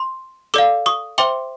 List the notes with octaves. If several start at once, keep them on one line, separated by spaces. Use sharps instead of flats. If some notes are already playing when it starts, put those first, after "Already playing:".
Already playing: C6
A4 D5 F5 D6 E6
C#6 D#6
C5 E5 G5 C6 D6